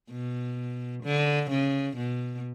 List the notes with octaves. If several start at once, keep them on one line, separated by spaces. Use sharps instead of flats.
B2
D3
C#3
B2